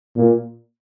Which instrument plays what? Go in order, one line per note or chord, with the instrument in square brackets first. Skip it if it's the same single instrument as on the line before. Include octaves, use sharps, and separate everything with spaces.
[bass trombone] A#2